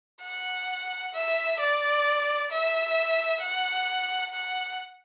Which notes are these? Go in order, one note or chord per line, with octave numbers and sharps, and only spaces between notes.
F#5
E5
D5
E5
F#5
F#5